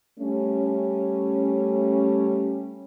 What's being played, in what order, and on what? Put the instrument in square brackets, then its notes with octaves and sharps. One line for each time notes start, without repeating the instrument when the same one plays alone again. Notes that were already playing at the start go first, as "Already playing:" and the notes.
[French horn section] G3 A3 C#4